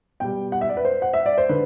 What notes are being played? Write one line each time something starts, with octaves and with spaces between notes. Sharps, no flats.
B2 G3 G5
F#5
E5
D5
B4
C5
F#5
E5
D5
C5
D3 B4